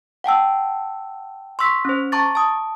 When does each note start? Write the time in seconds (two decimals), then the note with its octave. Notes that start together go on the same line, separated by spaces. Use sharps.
0.24 F#5 G5 A5 E6
1.59 C6 C#6 E6 B6
1.85 C#4 C5
2.12 A5 A#5 C#6 D6 A6
2.35 A5 D#6